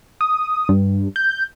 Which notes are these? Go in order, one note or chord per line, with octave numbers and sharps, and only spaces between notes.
D#6
G2
G6